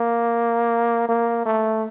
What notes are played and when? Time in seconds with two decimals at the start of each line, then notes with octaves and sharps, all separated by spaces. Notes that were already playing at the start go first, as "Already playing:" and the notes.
Already playing: A#3
1.09 A#3
1.45 A3